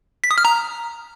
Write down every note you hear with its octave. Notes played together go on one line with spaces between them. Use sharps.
B6
D#6
F6
A#5